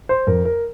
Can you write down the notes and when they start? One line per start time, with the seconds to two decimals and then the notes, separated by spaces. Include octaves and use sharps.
0.09 C5
0.27 F2 A#4
0.45 A#4